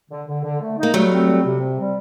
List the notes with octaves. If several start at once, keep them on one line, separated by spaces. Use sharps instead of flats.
D3
D3
D3
A3
D#4
A#3
F#3 G3 A3
C4
G3
C3
C4
G3